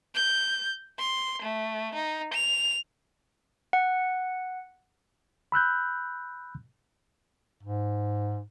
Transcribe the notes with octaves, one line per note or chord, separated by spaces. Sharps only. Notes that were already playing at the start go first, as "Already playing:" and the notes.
G6
C6
A3
D#4
F7
F#5
B5 E6 F#6 G6
G#2